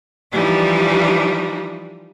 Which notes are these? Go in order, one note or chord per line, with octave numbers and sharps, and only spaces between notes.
E3 F3 G3 D4 D#4